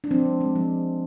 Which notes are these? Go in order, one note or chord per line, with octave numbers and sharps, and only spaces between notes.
D4
F3 C4
G#3
G#3
F3